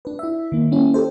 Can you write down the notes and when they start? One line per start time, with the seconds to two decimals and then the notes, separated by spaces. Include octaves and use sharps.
0.05 D4 B4
0.19 E4 E5
0.52 D#3 A#3
0.71 G3 A#3 C#4 E4
0.94 G4 A4 C5